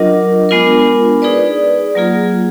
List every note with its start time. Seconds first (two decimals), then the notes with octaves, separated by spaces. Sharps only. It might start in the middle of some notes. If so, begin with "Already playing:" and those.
Already playing: F#3 D4 F4 A#4 D#5
0.49 G#3 B3 D4 F4 A#4
1.22 D#4 G#4 B4 D5
1.95 F#3 A#3 F4 G#4